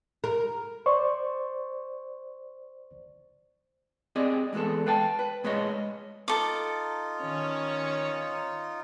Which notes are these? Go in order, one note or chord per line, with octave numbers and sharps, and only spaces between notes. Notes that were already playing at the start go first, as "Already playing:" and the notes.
A#4
C5 D5 C#6
C4 G4 G#4 D5 D#5
E2 G#3 B3 G#4 A4
B4 F5 G5 A5
B4
A#2 G#3 B4 C#5 D#5
D#4 F4 A4 D6
D#3 C#4 C#5